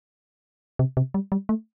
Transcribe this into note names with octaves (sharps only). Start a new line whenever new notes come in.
C3
C3
G3
G3
A3